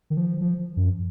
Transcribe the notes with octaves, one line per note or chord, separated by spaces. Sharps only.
D#3
F3
F3
F#2